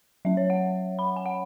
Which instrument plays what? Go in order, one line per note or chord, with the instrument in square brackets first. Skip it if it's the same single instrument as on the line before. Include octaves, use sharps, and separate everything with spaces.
[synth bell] F#3 C#4 E5
C#5
F#5
B5
G#5
F#5